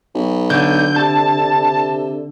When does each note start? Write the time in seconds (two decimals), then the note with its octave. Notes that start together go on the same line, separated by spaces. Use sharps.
0.15 B1
0.50 D3 G6
0.96 C3 A5